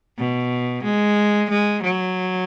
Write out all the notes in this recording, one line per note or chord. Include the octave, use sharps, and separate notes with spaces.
B2
G#3
G#3
F#3